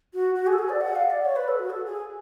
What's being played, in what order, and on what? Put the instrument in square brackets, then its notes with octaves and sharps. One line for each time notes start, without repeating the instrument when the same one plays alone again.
[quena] F#4
F#4
G#4
A4
G#4
D5
F#5
F5
D5
C#5
B4
A4
F#4
A4
G#4